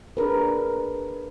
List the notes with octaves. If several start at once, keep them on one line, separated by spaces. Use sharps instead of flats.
D4 G#4 A#4 B4